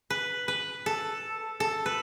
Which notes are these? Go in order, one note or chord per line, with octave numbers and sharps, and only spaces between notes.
B4
B4
A4
A4
B4